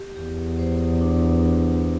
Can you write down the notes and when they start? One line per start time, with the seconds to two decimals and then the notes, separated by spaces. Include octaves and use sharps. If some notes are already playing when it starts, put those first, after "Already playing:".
Already playing: G4
0.15 E2 G4
0.59 C5
1.01 D4
1.44 D4